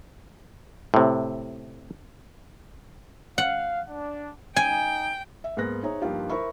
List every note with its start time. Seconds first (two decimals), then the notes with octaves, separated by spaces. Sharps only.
0.94 A2 C3
3.38 F5 F#5
3.89 D4
4.56 D#4 G5 G#5
5.44 E5
5.57 G#2 A#3 B3 F#6 A#6
5.83 D#4 G#4 C5 C#5 E5 A#5
6.02 G2 F3 A#3 D#4 F4 G4
6.30 E4 A#4 C5 E5 B5 C#6